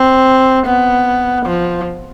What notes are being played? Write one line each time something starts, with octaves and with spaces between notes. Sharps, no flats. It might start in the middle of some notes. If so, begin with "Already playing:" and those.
Already playing: C4
B3
F3